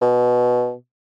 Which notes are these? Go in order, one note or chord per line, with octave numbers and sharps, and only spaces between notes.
B2